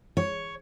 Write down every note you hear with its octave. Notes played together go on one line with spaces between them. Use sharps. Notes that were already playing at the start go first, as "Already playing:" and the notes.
C#5